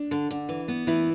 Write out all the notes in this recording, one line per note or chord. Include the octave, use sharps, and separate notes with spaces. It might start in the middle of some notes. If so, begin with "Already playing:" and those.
Already playing: D4
D3
D3
E3
B3
E3 E4